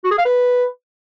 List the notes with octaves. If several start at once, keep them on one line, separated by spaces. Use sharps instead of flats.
F#4
G#4
F5
B4